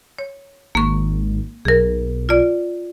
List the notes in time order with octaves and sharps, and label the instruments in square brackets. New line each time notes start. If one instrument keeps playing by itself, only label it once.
[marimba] C#5
[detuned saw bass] G#1 [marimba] A#3 C#6
[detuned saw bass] B1 [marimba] G#4 A#4
[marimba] F4 D5